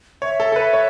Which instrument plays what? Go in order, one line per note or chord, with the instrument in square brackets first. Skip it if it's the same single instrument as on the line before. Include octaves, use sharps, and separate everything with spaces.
[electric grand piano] C#5 [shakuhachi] E5
[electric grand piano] A4
A4
B4
C#5